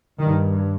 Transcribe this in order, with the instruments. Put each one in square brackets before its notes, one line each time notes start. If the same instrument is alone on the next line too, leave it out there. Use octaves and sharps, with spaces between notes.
[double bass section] G2 D#3